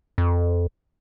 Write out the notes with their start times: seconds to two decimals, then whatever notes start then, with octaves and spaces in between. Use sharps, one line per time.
0.18 F2